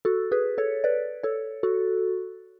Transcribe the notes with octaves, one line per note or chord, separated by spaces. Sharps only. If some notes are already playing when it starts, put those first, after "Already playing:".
F#4 A4
G#4 B4
A4 C#5
B4 D5
A4 C#5
F#4 A4